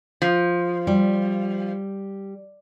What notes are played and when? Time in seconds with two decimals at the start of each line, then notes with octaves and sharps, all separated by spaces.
0.22 F3
0.87 G3